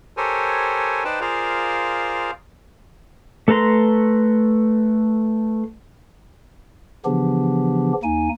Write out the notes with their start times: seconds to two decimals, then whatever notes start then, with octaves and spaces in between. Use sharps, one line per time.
0.17 G4 A4 A#4 C5 C#5 G#5
1.04 D#4 B4 C5 D5 G5 A5
1.21 F4 G#4 A#4 C5 D5 F5
3.48 A3 A4 B4 A#5 C6
7.05 C#3 E3 F3 B3 D4 G4
8.03 D#2 A#3 D#4 G#5